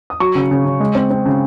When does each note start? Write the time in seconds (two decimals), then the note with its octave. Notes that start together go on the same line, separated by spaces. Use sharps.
0.10 D#6
0.20 F#3 C#6
0.35 C#3
0.51 C#3
0.65 C#3
0.80 G#3
0.95 C4
1.10 C4
1.26 C#3